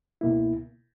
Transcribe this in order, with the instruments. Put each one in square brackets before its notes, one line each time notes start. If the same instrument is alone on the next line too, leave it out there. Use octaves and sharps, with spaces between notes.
[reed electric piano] C#2 B2 A#3 E4